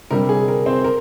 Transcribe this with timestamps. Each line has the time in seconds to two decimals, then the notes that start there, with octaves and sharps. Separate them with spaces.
0.11 C3 G3 D4 A#4
0.29 G#4
0.48 A#4
0.66 C4 C5
0.84 A#4